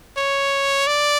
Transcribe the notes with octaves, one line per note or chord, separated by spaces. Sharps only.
C#5
D5